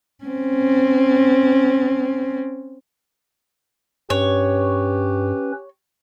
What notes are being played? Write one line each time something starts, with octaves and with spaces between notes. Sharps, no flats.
C4 C#4
G2 C#4 G4 B4 C#5